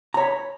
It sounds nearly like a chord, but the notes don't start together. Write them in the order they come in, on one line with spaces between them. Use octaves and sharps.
A#5 C#5 B5